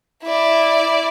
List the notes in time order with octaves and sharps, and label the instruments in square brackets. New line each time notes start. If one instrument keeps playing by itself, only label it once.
[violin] E4 D5